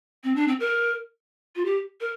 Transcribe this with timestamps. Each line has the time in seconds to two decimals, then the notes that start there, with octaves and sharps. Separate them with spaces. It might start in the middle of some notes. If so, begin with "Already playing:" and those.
0.24 C4
0.36 D4
0.48 C4
0.60 A#4
1.56 F4
1.65 G4
2.01 A#4